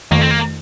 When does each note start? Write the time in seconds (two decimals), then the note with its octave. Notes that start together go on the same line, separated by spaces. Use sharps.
0.11 F2 D#3 A3 A#3
0.21 C4
0.31 A#3